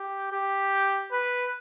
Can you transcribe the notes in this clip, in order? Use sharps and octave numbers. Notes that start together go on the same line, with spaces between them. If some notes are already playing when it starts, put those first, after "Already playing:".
Already playing: G4
G4
B4